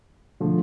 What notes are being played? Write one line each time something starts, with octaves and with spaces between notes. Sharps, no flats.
D3 F3 A3